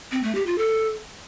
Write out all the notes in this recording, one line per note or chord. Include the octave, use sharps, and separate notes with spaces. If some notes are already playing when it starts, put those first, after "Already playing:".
C4
A3
G4
F4
A4